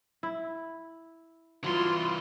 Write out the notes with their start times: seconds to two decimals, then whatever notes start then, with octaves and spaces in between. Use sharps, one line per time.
0.23 E4 E5
1.64 G2 E3 F#3 F4 C6